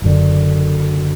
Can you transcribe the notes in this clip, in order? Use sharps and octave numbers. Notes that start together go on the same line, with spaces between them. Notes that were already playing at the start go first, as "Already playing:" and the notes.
F#1 F#2 D3